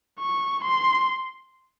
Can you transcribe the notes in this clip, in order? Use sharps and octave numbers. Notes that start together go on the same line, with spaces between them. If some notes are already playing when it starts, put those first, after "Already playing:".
C#6
C6